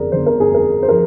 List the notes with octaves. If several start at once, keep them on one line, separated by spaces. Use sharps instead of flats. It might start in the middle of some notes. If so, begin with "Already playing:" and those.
Already playing: G1 F2 G#4 A#4 D5
G1 C5
A#4
G#4
F2 A#4
C5
F3 A#4